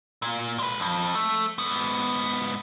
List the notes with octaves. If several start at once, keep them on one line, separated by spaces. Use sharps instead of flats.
A#2
G#3 B4
F2
A3
G#2 B3